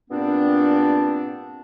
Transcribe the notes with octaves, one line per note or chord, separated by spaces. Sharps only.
G2 A#2 B3 C4 D4